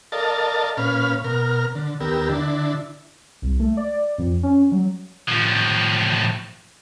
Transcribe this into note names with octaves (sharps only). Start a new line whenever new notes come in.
A4 A#4 D5 D#5 F5 A5
A#2 C#4 B4 F5 F6
B2 A#4 F6
D3
D#2 B3 G4 A#4 E6
D3 D4 E4
C2
A3
D5
F2
C#4
F#3
A2 F3